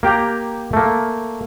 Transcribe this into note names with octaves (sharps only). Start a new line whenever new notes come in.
A#3 G4 G5 A#5
A3 A#3